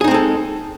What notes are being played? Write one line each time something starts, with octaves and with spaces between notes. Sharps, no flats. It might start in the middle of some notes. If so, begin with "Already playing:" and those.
G#3 C4 D#4 G#4 A4